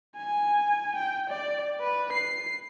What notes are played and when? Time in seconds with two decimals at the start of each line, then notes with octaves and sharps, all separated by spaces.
0.17 G#5
0.96 G5
1.30 D5
1.81 B4
2.12 C7